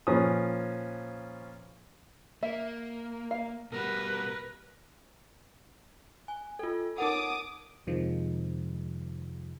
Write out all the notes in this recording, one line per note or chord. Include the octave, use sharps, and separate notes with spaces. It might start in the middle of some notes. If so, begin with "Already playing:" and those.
A#2 F3 C#4 B4 G#5 D#6
A#3 E5
F5
B2 G3 F#4 A#4 B4
G#5
F4 A4
D#4 A#4 F#5 D6 D#6
F2 C3 D#3 F3 G#3